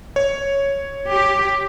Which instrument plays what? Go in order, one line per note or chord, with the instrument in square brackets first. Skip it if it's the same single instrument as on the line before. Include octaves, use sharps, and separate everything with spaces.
[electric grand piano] C#5
[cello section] G4